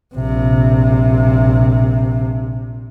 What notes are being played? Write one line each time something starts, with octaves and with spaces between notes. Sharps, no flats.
A#1 C3